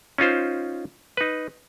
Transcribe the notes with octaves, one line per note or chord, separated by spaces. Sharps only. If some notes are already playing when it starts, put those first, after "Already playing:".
C#4 D#4 F4 C5
D#4 B4